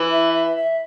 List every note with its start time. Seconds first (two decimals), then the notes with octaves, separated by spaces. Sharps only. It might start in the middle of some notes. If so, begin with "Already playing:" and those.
Already playing: E3
0.11 E5
0.34 E5
0.57 E5